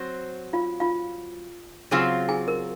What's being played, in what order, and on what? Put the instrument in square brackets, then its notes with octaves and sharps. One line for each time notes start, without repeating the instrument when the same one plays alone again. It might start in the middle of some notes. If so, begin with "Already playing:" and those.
Already playing: [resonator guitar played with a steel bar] F#3 C4 F#4 C5
[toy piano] F4 F5
F4 F5
[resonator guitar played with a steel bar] C#3 F#3 C4 F4 [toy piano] G#4 G#5
[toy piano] G#4 G#5
A#4